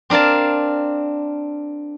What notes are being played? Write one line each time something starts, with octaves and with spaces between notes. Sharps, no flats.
C4 D4 A#4 F5 A5